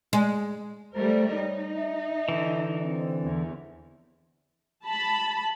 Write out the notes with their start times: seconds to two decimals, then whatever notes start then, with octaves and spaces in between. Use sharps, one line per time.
0.13 G#3
0.94 G3 A3 A#4 C5
1.34 D#4 C#5
1.76 E5
2.29 D3 E3
2.82 C4
3.24 E2
4.84 A5 B5